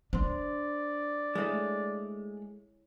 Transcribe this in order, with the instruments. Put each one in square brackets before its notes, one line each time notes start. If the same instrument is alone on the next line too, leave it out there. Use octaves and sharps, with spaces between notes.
[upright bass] D4 [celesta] C5 C6 [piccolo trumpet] D5
[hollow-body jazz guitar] G#3 A3 [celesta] E4 C#5